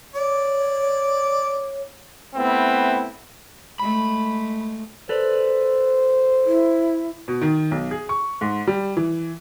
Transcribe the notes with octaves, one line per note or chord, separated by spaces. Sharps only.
C#5 D5
A3 B3 C4 E4
G#3 A3 B5
A4 B4 C5 D5
E4
B2
D#3
B1
G#4
C#6
G#2
G3
E3